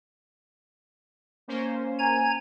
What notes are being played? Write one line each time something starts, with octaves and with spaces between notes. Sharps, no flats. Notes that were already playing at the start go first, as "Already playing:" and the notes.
A#3 C#4 C5
G#5 A#5 G#6